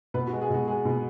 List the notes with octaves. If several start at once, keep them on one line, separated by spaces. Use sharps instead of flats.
B2 B4
F#4
G#3
G#4
B2 F#4
G#3 G#4
B2